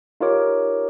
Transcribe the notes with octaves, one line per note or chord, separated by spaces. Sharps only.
D#4 F4 G4 A#4 C#5 D6